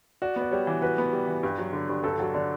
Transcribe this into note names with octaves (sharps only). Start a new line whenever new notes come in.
F#4 D5
B3
D5
G3 C#5
E3
F#4 B4
B3
G3
E3
G2
F#3
D3
G2
G2 A4
F#3 F#4
D3 D4